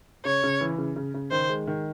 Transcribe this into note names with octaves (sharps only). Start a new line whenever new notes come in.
C#3 C#5
C#3
E3
C#3
C#3
C#3
D#3 C5
G#3
D#3